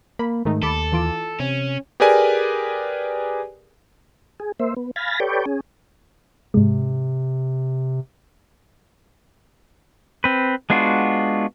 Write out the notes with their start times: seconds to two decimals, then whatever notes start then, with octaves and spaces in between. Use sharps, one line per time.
0.19 A#3 B5
0.45 G#2 D#3 A3 D#4
0.63 D#2 A4 B5 D6 A6
0.92 E3 F4 D6
1.40 C3 C#4
2.00 G4 G#4 A#4 B4 D5 G#5
4.40 G#4
4.60 A#3 C5 E5
4.76 B3
4.96 F5 G#5 B5 A6 A#6
5.20 G4 A4 B4 C#5 D5 G5
5.46 C#4 G#4
6.54 G#2 C3 G#3
10.24 C4 B4
10.70 G#3 B3 D4 F4 F#4